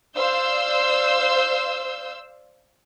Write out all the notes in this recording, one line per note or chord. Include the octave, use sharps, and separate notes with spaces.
C5 D5 F5 E6 G6